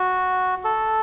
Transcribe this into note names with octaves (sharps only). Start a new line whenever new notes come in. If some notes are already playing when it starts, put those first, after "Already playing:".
Already playing: F#4
A4